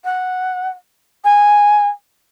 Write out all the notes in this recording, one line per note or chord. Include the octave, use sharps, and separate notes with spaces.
F#5
G#5